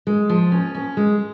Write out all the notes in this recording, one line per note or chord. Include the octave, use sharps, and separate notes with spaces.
G#3
F3
C#4
C#4
G#3